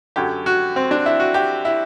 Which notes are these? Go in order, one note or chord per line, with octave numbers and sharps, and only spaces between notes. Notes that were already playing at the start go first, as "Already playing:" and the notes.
F#2 D3 F#3 G4
F#4
C4
D4
E4
F#4
G4
E4